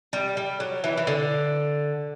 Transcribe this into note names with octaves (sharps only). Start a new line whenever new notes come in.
G3
G3
F#3
E3
E3
D3